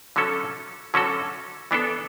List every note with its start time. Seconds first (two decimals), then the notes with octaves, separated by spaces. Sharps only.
0.16 D3 F#3 C#4 F#4 A4
0.94 D3 F#3 C#4 F#4 A4
1.71 E3 B3 D4 A4